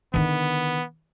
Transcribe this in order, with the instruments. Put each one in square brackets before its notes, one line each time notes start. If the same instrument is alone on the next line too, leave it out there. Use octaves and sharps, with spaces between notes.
[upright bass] D3 D#3 [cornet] B3